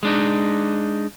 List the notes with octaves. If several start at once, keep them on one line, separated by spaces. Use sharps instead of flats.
G#3 D4 D#4